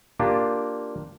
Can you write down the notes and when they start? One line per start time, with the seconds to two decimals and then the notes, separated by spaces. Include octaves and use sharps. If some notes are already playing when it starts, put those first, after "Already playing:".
0.20 A#3 D4 F4 G4